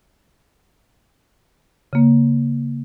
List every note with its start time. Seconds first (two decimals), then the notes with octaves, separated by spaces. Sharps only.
1.93 C#3 A#3